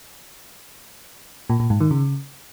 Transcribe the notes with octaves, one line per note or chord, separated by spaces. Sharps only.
A#2
A#2
G#2
D#3
C#3